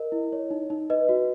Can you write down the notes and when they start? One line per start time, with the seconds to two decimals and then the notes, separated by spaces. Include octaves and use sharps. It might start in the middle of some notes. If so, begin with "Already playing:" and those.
Already playing: A#4 D#5
0.12 E4
0.32 C#5
0.51 D#4
0.70 D#4
0.90 B4 D#5
1.09 F#4